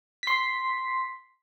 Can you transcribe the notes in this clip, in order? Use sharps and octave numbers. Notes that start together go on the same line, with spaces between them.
C6 B6